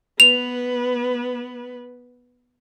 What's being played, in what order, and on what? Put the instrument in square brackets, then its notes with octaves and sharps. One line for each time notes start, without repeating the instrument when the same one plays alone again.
[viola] B3 B4 [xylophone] F7